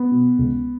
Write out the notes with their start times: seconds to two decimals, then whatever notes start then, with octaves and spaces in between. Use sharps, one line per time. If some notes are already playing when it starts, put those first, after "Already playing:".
Already playing: B3
0.11 B2
0.39 C#2